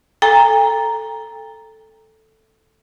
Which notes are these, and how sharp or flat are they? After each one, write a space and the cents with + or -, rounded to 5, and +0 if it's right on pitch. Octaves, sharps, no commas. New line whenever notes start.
A4 +0 G5 +45 A#5 +0